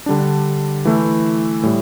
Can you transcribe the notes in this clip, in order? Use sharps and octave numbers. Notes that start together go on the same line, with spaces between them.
D3 G3 D4
E3 A3 E4
A2 G3